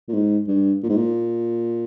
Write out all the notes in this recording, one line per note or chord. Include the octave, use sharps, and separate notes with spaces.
A#2
G#2
G2
A#2
G#2
A#2